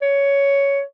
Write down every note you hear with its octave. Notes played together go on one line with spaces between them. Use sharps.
C#5